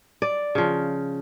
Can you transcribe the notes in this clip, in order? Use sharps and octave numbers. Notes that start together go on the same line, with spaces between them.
D5
C#3 F3